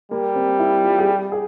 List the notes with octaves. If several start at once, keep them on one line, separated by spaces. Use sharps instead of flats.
G3 A#3
C4
E4
F4
G#4
G4
G#4